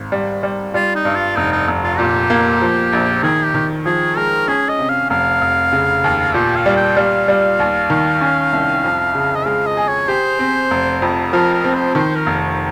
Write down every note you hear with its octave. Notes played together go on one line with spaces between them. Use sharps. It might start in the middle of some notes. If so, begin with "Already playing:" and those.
Already playing: G#1
G3
G3
G3 F4
D#4
G2
F4
F1 D#4
D#4
F1
F4
A#2 G4
A#3
F3
A#1
D#3 G#4
G4
D#3
F3 G#4
G#3 A#4
C#4 G#4
D#5
C3
F5
F1 F5
F1
C#3
D#2
A#2 G4
F5
G3
G5
G3 F5
G3
D#2
D#3
C#4
C2
F2
C#3
D#5
G#3 F5
D#5
G#4
C#5
G4 C5
C4
F1
F2
F3 A#4
A#4
C4
C5
D#3 C5
A#4
F1